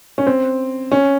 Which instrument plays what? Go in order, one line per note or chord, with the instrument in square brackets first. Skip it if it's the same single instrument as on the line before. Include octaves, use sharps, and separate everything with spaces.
[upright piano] C#4
C4
C#4